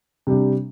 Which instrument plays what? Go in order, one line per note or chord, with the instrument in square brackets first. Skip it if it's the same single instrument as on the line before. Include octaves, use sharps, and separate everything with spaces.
[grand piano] C3 G3 D4